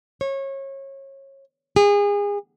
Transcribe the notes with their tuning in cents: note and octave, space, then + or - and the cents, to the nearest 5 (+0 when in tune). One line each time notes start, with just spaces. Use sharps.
C#5 -30
G#4 -30